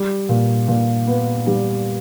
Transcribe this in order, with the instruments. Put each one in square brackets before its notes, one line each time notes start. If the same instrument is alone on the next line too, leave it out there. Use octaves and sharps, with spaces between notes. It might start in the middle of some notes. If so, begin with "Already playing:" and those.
Already playing: [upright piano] G3
A#2
A#2
B3
G3